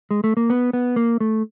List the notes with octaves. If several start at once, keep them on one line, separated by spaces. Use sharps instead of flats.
G#3
A3
A#3
B3
B3
A#3
A3